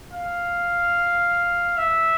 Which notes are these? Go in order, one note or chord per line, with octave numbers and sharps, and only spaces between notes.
F5
E5